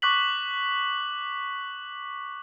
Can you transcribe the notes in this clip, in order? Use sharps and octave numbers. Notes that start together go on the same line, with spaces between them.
C#6 D6 F#6 B6 F#7